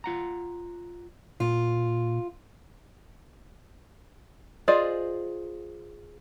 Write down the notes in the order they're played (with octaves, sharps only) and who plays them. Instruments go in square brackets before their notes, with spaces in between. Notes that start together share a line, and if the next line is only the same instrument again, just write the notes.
[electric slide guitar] F4 F#5 A#5
[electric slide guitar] A#2 [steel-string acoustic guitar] F4
[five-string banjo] F4 G#4 C5 D5 D#5